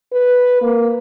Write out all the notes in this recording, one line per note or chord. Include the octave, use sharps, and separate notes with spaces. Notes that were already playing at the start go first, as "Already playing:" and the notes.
B4
A#3